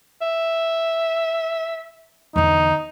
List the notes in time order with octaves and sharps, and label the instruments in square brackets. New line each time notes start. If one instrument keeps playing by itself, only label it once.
[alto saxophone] E5
[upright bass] E2 D3 [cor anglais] D#4